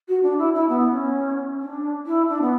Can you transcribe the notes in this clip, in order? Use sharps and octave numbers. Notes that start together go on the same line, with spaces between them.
F#4
D4
E4
E4
B3
C#4
D4
E4
D4
B3